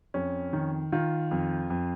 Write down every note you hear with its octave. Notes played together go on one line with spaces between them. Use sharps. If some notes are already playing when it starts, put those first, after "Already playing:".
F2 C#4
D#3
D#3 F4
F2
F2